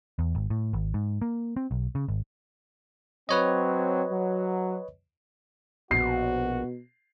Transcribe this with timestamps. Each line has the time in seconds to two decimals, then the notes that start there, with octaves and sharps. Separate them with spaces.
0.19 E2
0.35 G#1
0.50 A2
0.73 G#1
0.94 G#2
1.22 A#3
1.56 C4
1.71 B1
1.95 C#3
2.08 G#1
3.29 F#3 C4 B4 C#5 D#5
4.10 F#3
5.91 A#1 B2 F#4 C7